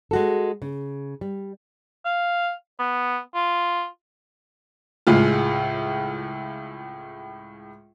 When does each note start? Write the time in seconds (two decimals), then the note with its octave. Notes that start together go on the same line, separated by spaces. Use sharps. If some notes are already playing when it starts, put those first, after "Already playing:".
0.11 G#3 F#4 A4
0.62 C#3
1.21 G3
2.05 F5
2.79 B3
3.35 F4
5.07 C#2 A2 G#3 F4